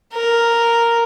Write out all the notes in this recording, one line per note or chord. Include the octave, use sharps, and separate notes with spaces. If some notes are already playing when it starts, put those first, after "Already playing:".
A#4